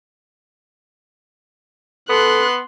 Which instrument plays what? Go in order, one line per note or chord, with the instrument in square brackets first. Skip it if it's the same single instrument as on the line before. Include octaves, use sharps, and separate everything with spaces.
[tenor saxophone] B3 [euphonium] A4 [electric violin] C6 F#6